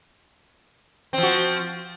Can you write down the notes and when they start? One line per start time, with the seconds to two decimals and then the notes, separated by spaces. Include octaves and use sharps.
1.13 C4
1.18 F3
1.23 F#4